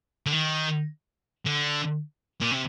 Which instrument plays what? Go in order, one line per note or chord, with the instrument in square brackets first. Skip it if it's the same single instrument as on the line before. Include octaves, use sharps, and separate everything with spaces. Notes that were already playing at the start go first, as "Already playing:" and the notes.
[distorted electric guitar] D3
D#3
D3
A#2
C3